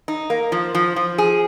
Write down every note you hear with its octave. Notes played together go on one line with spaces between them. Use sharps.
D#4
A#3
F3
F3
F3
G#4